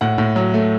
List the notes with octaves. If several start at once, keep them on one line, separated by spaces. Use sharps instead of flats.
A2 F#5
A2
F#3
A3